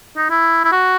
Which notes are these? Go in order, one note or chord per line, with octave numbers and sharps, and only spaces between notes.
D#4
E4
E4
F#4